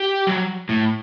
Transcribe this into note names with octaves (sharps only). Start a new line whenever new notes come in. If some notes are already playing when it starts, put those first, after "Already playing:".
Already playing: G4
F#3
A2